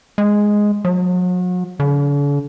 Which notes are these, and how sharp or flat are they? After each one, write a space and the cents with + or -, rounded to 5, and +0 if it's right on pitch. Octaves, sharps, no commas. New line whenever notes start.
G#3 +0
F#3 -40
D3 -45